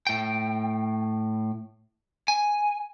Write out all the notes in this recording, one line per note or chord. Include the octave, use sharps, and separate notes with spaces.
A2 G5
G#5